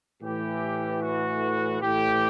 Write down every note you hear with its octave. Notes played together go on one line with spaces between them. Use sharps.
A2 E3 G4
F#4
A2 E3 G4